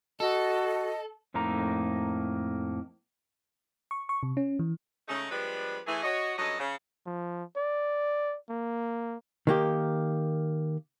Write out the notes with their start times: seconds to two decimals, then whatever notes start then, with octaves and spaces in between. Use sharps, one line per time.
0.20 F#4 A4 D#5
1.34 F2 A2 A#3 D#4 A#5
3.91 C#6
4.09 C#6
4.23 C3
4.37 C#4
4.59 E3
5.08 C#3 G#3 A3 C#4 D#4
5.31 F3 G3 G#3 B3 D4 B4
5.87 E3 A3 G#4
6.03 F#4 C#5 D#5
6.38 G2 F#3 C#4 A4 D#5
6.59 C#3
7.06 F3
7.57 D5
8.49 A#3
9.47 D#3 A#3 G4